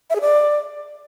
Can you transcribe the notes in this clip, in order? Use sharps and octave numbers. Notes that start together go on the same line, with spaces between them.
E5
G#4
D5